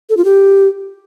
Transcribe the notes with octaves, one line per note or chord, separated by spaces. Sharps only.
A4
F4
G4